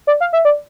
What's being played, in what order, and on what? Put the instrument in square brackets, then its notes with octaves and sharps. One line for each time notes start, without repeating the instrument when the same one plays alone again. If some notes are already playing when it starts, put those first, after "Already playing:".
[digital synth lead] D5
F5
E5
D5